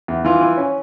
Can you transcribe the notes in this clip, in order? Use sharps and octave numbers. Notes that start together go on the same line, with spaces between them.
E2
E3 F4
E3
C#4